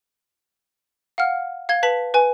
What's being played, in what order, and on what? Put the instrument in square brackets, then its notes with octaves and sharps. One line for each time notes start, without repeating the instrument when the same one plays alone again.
[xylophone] F5 F#5 F6
F5 G#6 G7
B4 A5 B6 F#7
B4 G#5